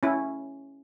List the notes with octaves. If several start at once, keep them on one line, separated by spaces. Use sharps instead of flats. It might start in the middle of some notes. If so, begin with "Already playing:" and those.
C#4 E4